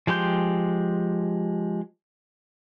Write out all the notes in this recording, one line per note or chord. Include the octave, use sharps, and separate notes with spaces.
F3 G#3 G4 C6 G6